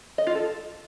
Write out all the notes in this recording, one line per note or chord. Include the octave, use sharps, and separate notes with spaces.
D#5
F4
A4